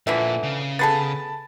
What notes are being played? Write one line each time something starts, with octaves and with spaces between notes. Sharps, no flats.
A#2 D3 E3 F3 E5
C#3
B3 G#4 A4 A5 B5 A6